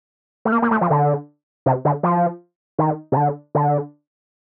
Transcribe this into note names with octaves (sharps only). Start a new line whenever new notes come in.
A3
A#3
A#3
A3
F3
D3
C3
D3
F3
D#3
C3
D3
D3